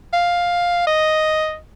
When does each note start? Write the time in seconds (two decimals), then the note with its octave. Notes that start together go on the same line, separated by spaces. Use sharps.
0.13 F5
0.87 D#5